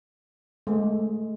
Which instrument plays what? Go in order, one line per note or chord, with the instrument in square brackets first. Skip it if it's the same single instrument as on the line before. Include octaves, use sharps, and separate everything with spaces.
[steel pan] G#3 A3